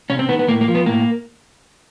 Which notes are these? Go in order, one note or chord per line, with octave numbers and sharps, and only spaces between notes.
C3 C#4
C4
D#3 B3
B3
A2 A#3
A#3
F3
B3
A2 A#3